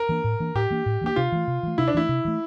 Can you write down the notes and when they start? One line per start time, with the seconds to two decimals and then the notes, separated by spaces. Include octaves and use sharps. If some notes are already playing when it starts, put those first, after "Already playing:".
Already playing: A#4
0.09 E3 A#3 D4
0.24 A2
0.40 E3 A#3 D4
0.55 A2 G4
0.70 E3 A#3 D4
0.86 A2
1.01 E3 A#3 D4 G4
1.16 C3 F4
1.32 E3 A3
1.48 C3
1.63 E3 A3
1.78 C3 E4
1.88 D4
1.94 E3 A3 E4
2.09 C3
2.25 E3 A3